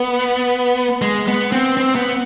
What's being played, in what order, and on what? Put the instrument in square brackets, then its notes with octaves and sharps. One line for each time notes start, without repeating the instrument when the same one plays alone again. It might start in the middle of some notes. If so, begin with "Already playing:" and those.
Already playing: [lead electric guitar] B3
G#3
B3
C4
C4
B3